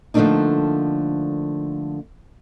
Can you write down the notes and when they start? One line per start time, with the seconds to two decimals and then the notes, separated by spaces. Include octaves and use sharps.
0.14 D3 F3 A3 A#3 D4 D#4